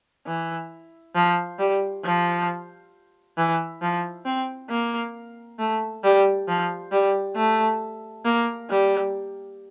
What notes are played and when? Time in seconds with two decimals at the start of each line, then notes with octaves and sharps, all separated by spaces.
0.27 E3
1.15 F3
1.59 G3
2.04 F3
3.38 E3
3.82 F3
4.25 C4
4.70 A#3
5.59 A3
6.04 G3
6.48 F3
6.92 G3
7.36 A3
8.25 A#3
8.70 G3